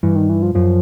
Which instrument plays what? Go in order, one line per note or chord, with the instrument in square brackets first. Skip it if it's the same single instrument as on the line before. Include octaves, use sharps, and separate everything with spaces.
[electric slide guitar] G2 [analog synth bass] E3
[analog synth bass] D#3
E3
F3
[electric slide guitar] F#2 [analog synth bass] F3